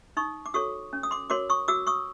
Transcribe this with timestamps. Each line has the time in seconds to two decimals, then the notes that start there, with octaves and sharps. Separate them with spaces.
0.17 D#4 C#6 D#6
0.46 D6
0.54 F#4 A4 C#5 C#6 D#6
0.93 C#4
1.03 D#6
1.11 C6 D6
1.30 F#4 A#4 C#5 C6 D6
1.50 C#6 D#6
1.68 F#4 D6 E6
1.87 C#6 D#6